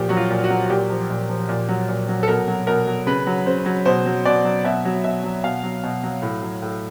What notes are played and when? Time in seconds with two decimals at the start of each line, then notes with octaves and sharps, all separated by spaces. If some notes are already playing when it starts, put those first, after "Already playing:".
Already playing: A#2 F3 G4
0.09 F#3 F#4
0.17 F4
0.30 A#2
0.44 F#4
0.50 F#3
0.65 F#4
0.70 A#2 G4
0.90 F3
1.10 A#2
1.29 F3
1.49 A#2
1.69 F#3
1.88 A#2
2.09 F#3
2.23 A4
2.28 B2 A#4
2.48 F#3
2.67 B2 A#4
2.87 F#3
3.07 C#3 B4
3.27 F#3
3.46 C#3 C5
3.66 F#3
3.85 B2 C5
4.06 F#3
4.25 B2 D5
4.44 F#3
4.64 B2 E5
4.85 F#3
5.04 B2 E5
5.24 F#3
5.44 B2 F5
5.63 F#3
5.83 B2
6.03 F#3
6.22 A2
6.42 F#3
6.62 A2